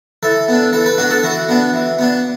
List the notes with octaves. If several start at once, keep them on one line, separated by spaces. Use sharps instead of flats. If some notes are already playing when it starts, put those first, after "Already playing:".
E3 A4
B3 D4
E3 A4
B4
B3 D4 F#4
A4
E3 F#4
B3 D4
E3
B3 D4